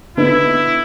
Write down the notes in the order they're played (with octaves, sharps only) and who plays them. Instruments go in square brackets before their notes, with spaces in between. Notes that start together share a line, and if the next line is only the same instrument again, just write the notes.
[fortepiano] D3 B3 D#4 [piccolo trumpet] E4